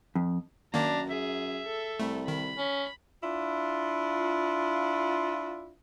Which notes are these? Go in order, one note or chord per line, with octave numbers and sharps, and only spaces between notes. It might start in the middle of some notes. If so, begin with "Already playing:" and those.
F2
F#2 D#3 A#3 D4 A#5
G#4 E5
A4
C2 A3
D#3 B5
C#4
D4 E4 F4